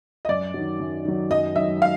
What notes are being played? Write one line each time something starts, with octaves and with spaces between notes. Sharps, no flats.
D#5
F#2 D5
D#3 F#3
F#2
D#3 F#3
F#2 D#5
D#3 F#3 E5
F5